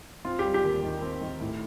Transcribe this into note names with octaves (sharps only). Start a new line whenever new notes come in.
C4 F4
G4
G3
G4
D#2
D#3
C4
D#3
A2